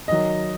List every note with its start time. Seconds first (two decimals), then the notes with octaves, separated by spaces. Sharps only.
0.08 D#3 F#3 D#5